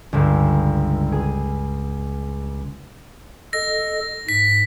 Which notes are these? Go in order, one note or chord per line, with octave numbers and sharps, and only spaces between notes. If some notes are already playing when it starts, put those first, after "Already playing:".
G1 C#2
G#4
A4 D#5 A#6
G#2 B6